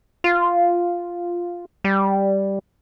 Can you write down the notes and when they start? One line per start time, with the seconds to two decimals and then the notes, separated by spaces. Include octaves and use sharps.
0.24 F4
1.84 G3